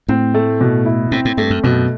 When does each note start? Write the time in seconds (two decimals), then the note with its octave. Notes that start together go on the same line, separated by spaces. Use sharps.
0.08 A2 C4
0.34 A3
0.61 B2
0.86 E4
1.12 A2 C4
1.25 A2
1.37 G2 A3
1.50 F#2
1.64 F#2 B2